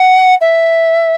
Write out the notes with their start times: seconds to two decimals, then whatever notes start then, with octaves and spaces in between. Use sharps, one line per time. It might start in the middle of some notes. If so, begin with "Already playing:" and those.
Already playing: F#5
0.41 E5